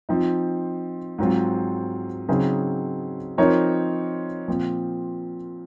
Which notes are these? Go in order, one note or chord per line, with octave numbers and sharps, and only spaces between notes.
F3 C4 D#4
G#2 F#3 C4 F4
C#3 F#3 C4 D#4 G#4
F3 C4 D#4 A#4 C#5
A#2 F3 C4